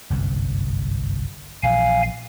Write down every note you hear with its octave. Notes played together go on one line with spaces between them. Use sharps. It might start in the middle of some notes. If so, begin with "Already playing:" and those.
G1 C2 F#2
A#1 E3 F5 G#5